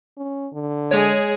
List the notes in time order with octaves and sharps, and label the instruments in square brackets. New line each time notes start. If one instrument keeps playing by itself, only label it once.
[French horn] C#4
D3
[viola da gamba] G#3 G#4 [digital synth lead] C#5